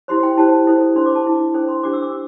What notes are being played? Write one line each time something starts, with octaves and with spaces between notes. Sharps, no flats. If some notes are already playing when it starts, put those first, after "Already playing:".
E4 G4 C5 C6
G5
E4 G4 C5 A5
E4 A4 C5
D4 C5 C6
D6
A5
E4 C5
D4 A4 C5 G5
C6
D4 G4 C5 D6
E6
D6